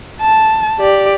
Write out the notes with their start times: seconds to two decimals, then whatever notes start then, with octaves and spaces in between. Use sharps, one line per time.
0.21 A5
0.80 G4 D5